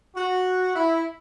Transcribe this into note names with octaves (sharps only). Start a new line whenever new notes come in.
F#4
E4